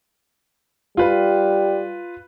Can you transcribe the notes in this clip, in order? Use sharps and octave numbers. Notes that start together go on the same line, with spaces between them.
G3 F4 B4